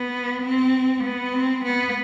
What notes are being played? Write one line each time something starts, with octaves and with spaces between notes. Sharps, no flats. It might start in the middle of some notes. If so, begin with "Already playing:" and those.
Already playing: B3
C4
B3
C4
B3